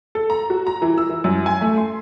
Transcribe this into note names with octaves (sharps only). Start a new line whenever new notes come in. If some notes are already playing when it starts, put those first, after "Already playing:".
A4
A#5
F#4
A#5
E3
E6
E3
F#2
G#5
A3
C6